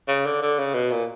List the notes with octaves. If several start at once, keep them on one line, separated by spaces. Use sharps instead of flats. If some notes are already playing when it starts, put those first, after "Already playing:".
C#3
D3
D3
C#3
B2
A#2